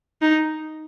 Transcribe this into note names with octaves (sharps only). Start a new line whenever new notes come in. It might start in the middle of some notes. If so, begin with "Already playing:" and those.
D#4